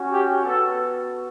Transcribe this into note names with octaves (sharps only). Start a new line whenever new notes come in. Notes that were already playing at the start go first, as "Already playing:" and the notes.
Already playing: C#4 F#4
G4
B3 F#4 A4